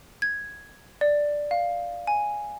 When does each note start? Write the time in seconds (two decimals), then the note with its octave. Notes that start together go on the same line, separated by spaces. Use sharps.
0.22 G#6
1.01 D5
1.51 F5
2.07 G#5